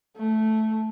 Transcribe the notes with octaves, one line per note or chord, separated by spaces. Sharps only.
A3